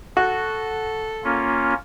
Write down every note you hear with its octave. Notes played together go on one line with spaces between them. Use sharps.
F#4 A4
A#3 C#4 F4